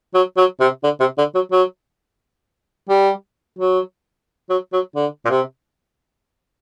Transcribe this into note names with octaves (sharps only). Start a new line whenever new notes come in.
F#3
F#3
C3
D3
C3
D3
F#3
F#3
G3
F#3
F#3
F#3
D3
A#2
C3